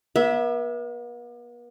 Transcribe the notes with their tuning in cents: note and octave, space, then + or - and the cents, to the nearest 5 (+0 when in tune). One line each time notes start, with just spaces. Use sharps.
B3 -45 E5 +0